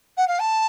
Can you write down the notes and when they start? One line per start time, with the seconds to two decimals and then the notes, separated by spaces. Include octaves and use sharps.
0.17 F#5
0.27 F5
0.39 A5